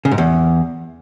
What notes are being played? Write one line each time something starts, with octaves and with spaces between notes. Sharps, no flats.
C#3
G#2
E2